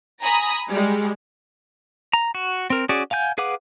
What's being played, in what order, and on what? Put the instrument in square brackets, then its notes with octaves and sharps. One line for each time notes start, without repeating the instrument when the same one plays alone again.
[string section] G#5 A#5 B5 D#6
G3 G#3
[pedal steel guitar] A#5
F#4
C4 A#4
C#4 F#4 G#4 D5
F5 F#5 G#5 G6
G#4 B4 F5 F#5 D6